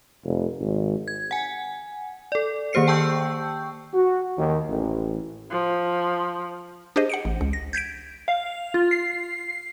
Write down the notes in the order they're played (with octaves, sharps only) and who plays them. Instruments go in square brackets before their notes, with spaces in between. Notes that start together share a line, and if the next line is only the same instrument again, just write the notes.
[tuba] F1
G#1
[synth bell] G#6
F#5 G#5
A4 D5
D#3 A#3 G4 C5 C7 C#7
G5 A5 C#6 E6 G6
[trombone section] F#4
D#2
A1
[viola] F3
[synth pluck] D4 G4 G#4 C5 D#5
F#5 C#7 D7
A1
C#2
A#6
G6 G#6 B6 D7
[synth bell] F5
F4
C7